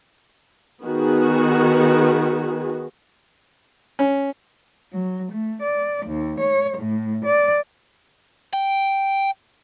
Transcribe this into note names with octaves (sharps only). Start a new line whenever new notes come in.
D#3 B3 F#4 G#4
C#4
F#3
A3
D5
D#2
C#5
A2
D5
G5